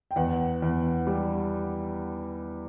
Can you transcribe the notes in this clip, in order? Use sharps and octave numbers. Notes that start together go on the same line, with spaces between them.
G5
E2 F#5
E2
G3